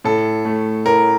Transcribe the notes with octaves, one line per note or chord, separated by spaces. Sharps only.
A2 A4
A3
A2 A#4